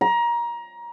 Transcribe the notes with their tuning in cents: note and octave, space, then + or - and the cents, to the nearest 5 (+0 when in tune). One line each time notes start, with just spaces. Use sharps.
A#5 +25